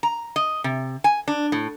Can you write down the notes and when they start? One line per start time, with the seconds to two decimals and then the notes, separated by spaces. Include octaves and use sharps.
0.03 A#5
0.36 D#5
0.64 C3
1.04 G#5
1.28 D4
1.52 A2